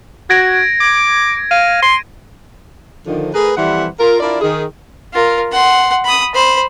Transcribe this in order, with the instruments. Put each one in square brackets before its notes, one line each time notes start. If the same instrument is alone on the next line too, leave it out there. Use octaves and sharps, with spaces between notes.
[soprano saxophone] F#4 [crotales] G#6 A#6 D7
[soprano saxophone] D6
[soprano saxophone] F5 [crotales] D#7
[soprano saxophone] C6
[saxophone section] D3 D#3 F3
A3 G#4 A#4 B4
F2 E3 G3 C5 E5 F#5
F4 A#4
D4 E4 F4 A#4 D5
D#3 G#4
[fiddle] F4 A#4
F#5 C6
B5 D#6
C5 B5